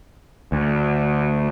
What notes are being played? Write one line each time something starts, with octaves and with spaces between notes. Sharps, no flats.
D2